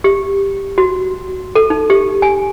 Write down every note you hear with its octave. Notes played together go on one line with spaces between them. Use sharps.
G4
F#4
A4
D#4
G4
G#5